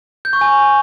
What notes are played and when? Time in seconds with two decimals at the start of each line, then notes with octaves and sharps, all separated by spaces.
0.25 G6
0.33 C#6
0.41 G#5